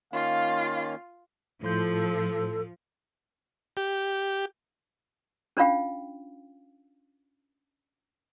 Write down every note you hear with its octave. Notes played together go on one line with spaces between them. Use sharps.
D#3 A#3 C#4 F4 F5
A2 F3 A4 C6 G6
G4
C#4 D4 F4 F5 G5